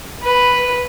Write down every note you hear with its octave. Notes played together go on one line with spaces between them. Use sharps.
B4